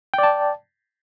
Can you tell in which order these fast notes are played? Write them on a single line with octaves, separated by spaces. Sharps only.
G5 D5 A5